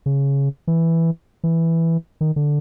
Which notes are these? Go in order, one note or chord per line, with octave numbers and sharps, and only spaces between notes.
C#3
E3
E3
D#3
D3